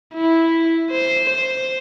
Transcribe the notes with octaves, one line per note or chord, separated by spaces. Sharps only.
E4
C5
C5